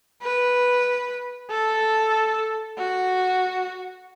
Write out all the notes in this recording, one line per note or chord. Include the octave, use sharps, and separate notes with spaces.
B4
A4
F#4